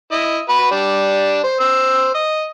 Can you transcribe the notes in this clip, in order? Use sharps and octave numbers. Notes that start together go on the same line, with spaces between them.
E4 D#5
F#4 B4 B5
G3 D4
C5
C5 E6
D#5